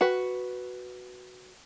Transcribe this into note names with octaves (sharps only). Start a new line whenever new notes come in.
F#4 B4